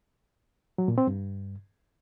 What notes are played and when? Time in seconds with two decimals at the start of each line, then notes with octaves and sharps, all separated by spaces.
0.78 F#3
0.88 A#2
0.98 C4
1.07 G2